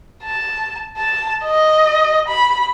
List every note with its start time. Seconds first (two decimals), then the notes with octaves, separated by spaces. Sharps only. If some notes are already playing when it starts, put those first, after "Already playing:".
0.24 A5
0.97 A5
1.44 D#5
2.28 B5